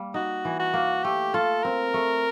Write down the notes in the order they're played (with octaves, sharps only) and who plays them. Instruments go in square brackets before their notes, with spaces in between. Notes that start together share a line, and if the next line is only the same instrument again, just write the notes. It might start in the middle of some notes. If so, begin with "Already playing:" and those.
Already playing: [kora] G3 A#3
[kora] D#4 [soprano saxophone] F#4
[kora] E3
[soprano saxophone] F#4
[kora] A#3
[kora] A3 [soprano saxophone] G4
[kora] F4 [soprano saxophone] A4
[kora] C4 [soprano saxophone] A#4
[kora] A3